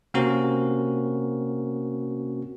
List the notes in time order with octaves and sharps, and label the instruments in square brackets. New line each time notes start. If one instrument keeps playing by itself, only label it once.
[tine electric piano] C3 A#3 C4 C#4 F#4 A#4